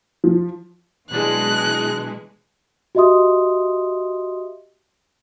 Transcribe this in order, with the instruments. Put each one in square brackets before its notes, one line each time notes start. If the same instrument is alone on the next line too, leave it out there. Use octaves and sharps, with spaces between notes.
[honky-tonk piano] F3
[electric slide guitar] B2 F#3 D4 [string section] E3 G#3 [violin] F#6
[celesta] F#4 G4 D#5 E5 C6 D#6